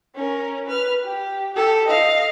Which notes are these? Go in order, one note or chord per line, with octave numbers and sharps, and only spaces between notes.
C#4 A#4
B4 F6
G4
G4 A4
D#5 F5